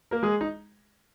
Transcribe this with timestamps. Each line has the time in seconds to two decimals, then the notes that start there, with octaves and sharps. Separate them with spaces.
0.11 A#3 A#4
0.23 G#3 G#4
0.41 D#4